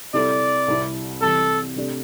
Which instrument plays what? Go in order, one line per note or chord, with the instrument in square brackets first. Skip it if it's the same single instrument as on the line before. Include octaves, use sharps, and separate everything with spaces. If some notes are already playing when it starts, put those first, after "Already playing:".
[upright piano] C3 G3 E4 A4 [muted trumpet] D5
[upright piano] C2 C3 G3 E4
[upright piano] C3 E3 G3 [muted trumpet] A4
[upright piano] C3 A3 D4 G4 D5